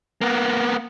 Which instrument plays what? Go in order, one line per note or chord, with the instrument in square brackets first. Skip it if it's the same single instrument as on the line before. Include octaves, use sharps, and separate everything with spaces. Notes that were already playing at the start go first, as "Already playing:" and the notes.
[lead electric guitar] A#3 B3